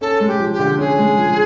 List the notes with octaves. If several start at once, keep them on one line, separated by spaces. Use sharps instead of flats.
C#4 A4
G#3
G4
F3
G4
D3
C#4 G#4
G#3
F3